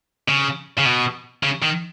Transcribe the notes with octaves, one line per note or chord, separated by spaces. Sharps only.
C#3
C#3
B2
C#3
D#3